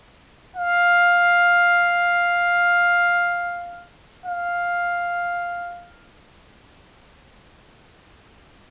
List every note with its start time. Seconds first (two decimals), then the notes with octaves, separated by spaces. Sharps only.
0.56 F5
4.26 F5